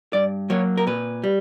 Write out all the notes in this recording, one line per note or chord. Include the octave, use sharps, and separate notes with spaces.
G2 D5
F#3 A#3 C#5
A#4
A#2 B4
G3